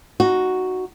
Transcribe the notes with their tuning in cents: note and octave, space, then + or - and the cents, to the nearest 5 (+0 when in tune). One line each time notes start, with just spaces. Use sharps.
D#4 -5 F#4 +0